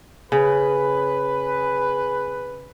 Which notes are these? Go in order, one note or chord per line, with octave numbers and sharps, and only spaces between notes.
C#3 G#4 B4